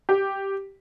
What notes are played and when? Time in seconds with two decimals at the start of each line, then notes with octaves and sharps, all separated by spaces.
0.09 G4